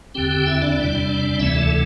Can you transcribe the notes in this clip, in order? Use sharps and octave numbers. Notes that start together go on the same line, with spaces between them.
E2 D3 C4 G4 G5
G4 G5
E4 E5
D4 D5
E2 C3 G3 C4
D2 C3 E3 A3 E4 E5
A4 A5